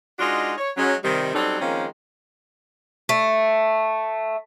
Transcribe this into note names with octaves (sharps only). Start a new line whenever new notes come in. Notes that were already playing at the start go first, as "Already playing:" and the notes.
G#3 D4 D#4 F4 F#4
C#5
F#3 G#3 C#4
C3 D#3 G3
F#3 G3 C4 C#4 D#4 A4
D#3 F3 G#3 A#3 C4 C#4
A3